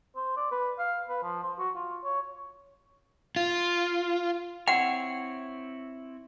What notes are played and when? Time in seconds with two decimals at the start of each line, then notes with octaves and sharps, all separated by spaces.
0.16 C5
0.37 D5
0.51 B4
0.79 F5
1.08 B4
1.23 F3
1.43 C5
1.59 F#4
1.76 F4
2.04 C#5
3.36 F4
4.68 C4 E4 C#5 F#5 G5